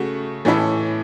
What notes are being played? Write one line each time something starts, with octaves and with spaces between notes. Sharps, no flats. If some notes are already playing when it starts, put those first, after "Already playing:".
Already playing: C#3 A3 F#4
A2 E3 C#4 E4 A4